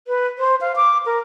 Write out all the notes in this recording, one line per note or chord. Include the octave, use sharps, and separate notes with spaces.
B4
C5
F5
D6
A#4